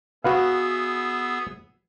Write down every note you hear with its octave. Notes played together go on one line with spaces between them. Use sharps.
B3 F#4 G#4 B4 E5 F5